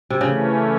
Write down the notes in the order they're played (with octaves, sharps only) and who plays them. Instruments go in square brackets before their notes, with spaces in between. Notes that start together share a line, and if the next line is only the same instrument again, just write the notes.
[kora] C3
[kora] C#3 [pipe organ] E3 A3 C#4